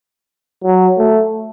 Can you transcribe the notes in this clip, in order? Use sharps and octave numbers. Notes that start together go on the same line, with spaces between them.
F#3
A3